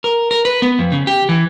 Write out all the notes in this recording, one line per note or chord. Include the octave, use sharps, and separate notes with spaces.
A#4
A#4
B4
B3
F2
C#3
G4
E3